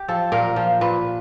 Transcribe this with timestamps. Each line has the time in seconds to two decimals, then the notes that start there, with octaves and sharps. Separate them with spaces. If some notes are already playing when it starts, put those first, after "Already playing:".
Already playing: G4
0.08 F3 A4
0.32 A#2 A#4
0.56 F3
0.81 A#2 B4